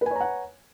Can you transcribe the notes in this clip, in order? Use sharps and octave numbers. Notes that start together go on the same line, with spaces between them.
B4 C#5 F#5 G#5 A#5